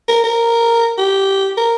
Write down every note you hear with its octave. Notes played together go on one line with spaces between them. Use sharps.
A#4
A#4
G4
A#4